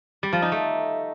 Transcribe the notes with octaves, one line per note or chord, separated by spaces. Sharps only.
G3
F3
D#4
A3